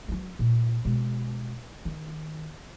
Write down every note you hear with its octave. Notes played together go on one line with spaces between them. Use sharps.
F#3 G3
A#2
B2 G#3
D#3